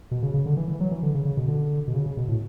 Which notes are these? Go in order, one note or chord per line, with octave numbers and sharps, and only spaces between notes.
B2
C#3
C#3
D3
E3
E3
F#3
E3
D3
C#3
C#3
B2
D3
B2
C#3
C#3
B2
A2